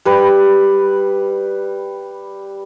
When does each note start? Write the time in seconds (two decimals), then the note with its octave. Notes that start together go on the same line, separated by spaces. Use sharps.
0.05 G3 B4